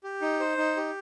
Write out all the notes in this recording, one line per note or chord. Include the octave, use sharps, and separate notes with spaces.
G4
D#4
C5
D#4
G4